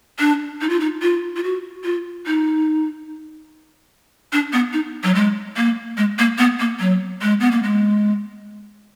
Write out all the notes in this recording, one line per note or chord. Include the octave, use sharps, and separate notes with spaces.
D4
D#4
F4
D#4
F4
F4
F#4
F4
D#4
D4
B3
D#4
F#3
G#3
A#3
G#3
A#3
B3
A#3
F#3
G#3
B3
A#3
G#3